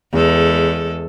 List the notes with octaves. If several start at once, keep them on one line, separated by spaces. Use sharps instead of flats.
E2 G#3 A4